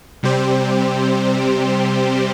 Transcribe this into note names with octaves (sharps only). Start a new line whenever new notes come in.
C3 G3 C4 G4 C5